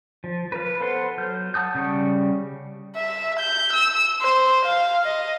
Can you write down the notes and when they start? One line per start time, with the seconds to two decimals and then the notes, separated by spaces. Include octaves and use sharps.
0.24 F3
0.52 B4 F5
0.81 B3 A4 C5 F#5 C6
1.18 F#3 F6 G6
1.54 F#5 A5 D#6 G6
1.75 C#3 G3 C#6
2.97 E5
3.40 G6
3.73 E6
4.22 C5
4.66 F5
5.04 D#5